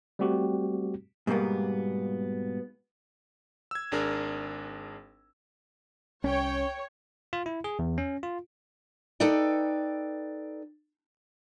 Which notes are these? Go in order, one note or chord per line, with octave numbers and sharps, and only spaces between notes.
G3 A3 C4 F#4 G4
G#2 B2 G3 A#3 B3
E6 G#6
G#1 D4 G#4 A#4
C2 C#4 C#5 G5
F4
E4
G#4
E2
C#4
F4
D#4 A4 B4 D5 G5